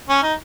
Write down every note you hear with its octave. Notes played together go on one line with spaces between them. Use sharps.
C#4
D#4